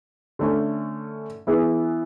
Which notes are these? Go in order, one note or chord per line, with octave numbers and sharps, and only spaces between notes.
D3 A3 C#4
E3 B3 E4 G#4